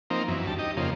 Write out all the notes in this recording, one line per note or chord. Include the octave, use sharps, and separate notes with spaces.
F3 A#3 C4 D#4
F#2 E3
D2 G3 A5
D#4 G4 D#5
F2 C#3 F3 A#3